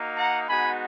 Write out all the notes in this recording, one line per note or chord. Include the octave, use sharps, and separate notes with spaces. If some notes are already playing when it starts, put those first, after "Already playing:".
Already playing: A#3 D#4 F#4
F#5 A#5
G#3 B3 D#4 F#4 G#5 B5